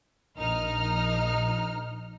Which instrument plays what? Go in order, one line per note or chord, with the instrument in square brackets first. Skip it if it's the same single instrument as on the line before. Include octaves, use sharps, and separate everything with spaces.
[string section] A#1 D#4 F6